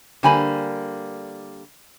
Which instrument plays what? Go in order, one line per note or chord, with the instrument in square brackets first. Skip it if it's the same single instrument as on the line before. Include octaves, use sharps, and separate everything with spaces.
[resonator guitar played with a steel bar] D3 G3 A#3 [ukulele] C5 G#5 B5